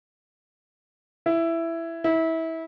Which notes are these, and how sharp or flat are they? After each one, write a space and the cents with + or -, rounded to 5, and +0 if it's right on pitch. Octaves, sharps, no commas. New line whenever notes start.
E4 +10
E4 -25